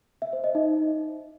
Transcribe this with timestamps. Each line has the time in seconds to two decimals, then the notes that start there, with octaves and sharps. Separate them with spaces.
0.22 E5
0.33 C5
0.44 D#5
0.55 D#4